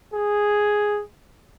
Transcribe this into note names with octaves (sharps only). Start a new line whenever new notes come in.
G#4